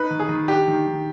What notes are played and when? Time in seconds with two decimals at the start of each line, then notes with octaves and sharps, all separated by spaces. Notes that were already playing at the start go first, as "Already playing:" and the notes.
Already playing: D#4 B4
0.10 D#3
0.19 G#4
0.29 D#3
0.48 D4 G4
0.68 D#3
0.87 D#3